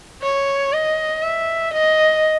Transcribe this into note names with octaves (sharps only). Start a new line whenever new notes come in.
C#5
D#5
E5
D#5